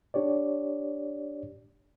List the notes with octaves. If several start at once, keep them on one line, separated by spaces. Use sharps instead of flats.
D4 G4 C#5 D5